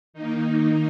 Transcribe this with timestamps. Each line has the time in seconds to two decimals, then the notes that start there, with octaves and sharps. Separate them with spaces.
0.14 D#3 A#3 D#4